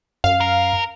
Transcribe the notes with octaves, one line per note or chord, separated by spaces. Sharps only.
F#2 F5
A#4